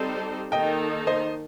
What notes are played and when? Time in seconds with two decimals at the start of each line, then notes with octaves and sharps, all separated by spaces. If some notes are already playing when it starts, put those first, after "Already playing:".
Already playing: G3 C4 D#4 A4 C5 A5
0.52 D#3 A#3 D#4 A4 D#5 G5
1.07 C5 D#5